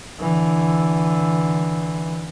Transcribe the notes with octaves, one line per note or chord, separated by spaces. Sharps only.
D3 E3